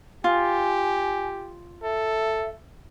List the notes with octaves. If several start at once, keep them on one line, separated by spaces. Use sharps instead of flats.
F4 G4 G#5
A4 E5